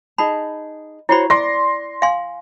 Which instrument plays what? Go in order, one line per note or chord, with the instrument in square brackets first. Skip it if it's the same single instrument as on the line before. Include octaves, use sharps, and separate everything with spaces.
[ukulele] D#4 G#4 A5 [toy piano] B5
[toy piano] E4 B5 [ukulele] F#4 C5 C#5
[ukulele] D5 [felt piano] C6 A#6
[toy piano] F5 G#5 C6